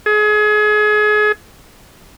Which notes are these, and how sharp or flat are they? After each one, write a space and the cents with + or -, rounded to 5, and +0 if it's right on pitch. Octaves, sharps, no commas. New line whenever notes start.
G#4 +30